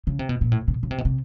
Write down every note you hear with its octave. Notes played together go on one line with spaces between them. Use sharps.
C#3
C3
B2
A#2
A2
B2
C#3
C3
B2
C3